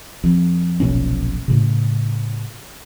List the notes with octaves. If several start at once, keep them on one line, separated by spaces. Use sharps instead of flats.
F2
F1 B1 A#2 C#4
A2 C#3